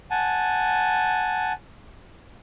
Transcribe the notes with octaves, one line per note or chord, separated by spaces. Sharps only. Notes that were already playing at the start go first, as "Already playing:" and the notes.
F#5 G#5 A5